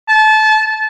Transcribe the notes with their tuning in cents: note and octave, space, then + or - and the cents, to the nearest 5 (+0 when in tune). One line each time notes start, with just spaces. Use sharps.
A5 -25